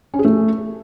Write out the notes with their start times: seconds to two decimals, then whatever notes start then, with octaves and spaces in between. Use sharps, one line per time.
0.14 C#4
0.19 G#4
0.25 A3